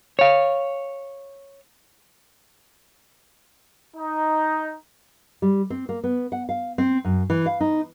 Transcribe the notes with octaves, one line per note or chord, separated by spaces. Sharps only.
C#5 F5
D#4
G3
C4
A#3
B3
F#5
F5
C4
F#2
E3
F5
D#4